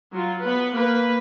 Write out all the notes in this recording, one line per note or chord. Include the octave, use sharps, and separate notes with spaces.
F#3 F4
B3 B4
A#3 B4